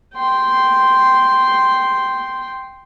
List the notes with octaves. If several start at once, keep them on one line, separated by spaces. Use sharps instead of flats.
G5 C6